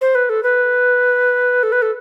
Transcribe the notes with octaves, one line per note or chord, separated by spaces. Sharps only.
C5
B4
A4
B4
A4
B4
A4